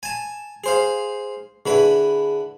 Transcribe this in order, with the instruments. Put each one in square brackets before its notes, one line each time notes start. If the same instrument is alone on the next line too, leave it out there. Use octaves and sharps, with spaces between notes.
[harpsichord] G#5 A5
G#4 C5 F5
[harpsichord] D3 E4 B4 [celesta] G#4